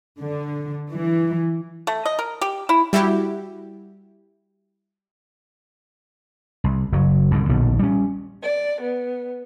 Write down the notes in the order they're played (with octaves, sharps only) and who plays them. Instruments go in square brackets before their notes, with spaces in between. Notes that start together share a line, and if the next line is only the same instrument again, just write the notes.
[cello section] D3
E3
[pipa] A3
D#5
A#4
G4
E4
[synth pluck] G3 E4 F#4 G4
[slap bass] C2
F#1 F#3
C2 G#2 D3
A#1 D#2 B2 D3
G3 C#4
[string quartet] D5
B3